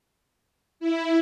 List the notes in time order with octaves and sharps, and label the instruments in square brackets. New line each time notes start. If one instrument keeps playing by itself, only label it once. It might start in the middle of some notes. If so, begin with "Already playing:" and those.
[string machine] E4